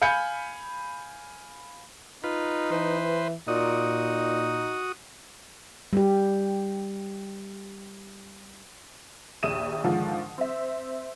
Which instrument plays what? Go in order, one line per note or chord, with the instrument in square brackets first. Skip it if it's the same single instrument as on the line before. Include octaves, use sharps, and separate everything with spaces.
[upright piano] F5 G#5 B5 G6 C#7
[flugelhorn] D#4 [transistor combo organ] F4 B4
[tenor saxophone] E3 [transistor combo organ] B4 C5
[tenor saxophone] A#2 [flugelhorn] D#4 [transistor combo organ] F#4 D#6
[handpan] G3 G4
[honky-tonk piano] A#1 D#2 E5 D#6 D#7 E7
G#2 D3 D#3 F3
C4 E5